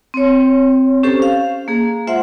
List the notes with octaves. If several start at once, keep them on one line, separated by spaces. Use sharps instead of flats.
C4 C#5
C#4 G4 A4 C5 C#6
F5
A#3 G#4
G#3 F4 C5 E5 F#5 C6